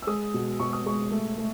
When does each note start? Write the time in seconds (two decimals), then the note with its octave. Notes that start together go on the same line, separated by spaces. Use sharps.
0.02 E6
0.07 G#3 D#6
0.34 B2
0.60 B2 C#6
0.73 D#6
0.86 G#3 C#6
1.11 A3
1.38 A3